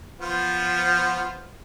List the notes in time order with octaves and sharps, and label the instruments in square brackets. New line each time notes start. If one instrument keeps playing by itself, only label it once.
[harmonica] F3 B3 F4